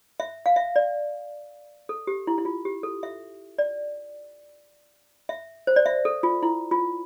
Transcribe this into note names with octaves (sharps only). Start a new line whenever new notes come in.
E5
F5
E5
D5
A4
G4
E4
E4
F4
G4
A4
E5
D5
E5
C5
D5
E5
A4
F4
E4
F4